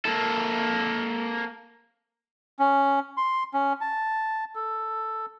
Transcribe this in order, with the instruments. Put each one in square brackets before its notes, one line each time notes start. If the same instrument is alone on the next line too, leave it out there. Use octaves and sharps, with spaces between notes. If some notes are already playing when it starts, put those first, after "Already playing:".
[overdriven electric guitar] A#3 A4
[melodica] C#4
C6
C#4
A5
A4